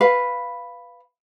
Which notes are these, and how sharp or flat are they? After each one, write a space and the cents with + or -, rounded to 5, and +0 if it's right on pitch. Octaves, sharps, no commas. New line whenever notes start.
B4 +0 F5 -5